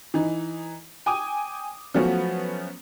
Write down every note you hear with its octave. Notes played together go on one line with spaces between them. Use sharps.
E3 D#4
G5 G#5 D6 D#6
F3 F#3 A3 B3 C#4 F#4